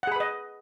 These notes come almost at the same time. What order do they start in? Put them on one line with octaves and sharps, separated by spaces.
F#5 G#4 B5 B4 D#5